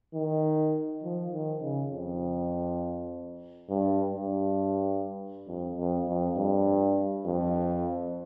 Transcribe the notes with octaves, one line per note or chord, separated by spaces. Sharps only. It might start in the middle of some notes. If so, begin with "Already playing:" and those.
D#3
F3
D#3
C#3
F2
G2
G2
F2
F2
F2
G2
F2